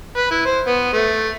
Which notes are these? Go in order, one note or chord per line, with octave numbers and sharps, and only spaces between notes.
B4
E4
C5
B3
A3